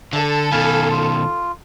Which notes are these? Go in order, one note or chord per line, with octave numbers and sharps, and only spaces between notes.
D3 A4
B2 D#3 F5 G#5 B5
F4